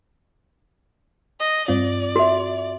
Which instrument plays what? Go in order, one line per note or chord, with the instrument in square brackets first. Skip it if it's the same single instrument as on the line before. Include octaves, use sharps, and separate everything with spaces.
[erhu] D#5
[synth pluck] G2 C4 F4 [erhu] D5
[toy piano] F#4 E5